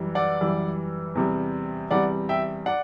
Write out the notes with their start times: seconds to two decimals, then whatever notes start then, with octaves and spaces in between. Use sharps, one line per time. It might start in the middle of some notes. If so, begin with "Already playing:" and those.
Already playing: F#2 E3 G3
0.15 D5 F#5
0.40 F#2 E3 G3
1.15 E2 C3 G3
1.91 E2 C3 G3 D5 F#5
2.29 E5 G5
2.66 D5 F#5